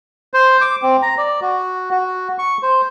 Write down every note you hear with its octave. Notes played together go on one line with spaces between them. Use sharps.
C5
D6
C4
A#5
D5
F#4
F#4
C#6
C5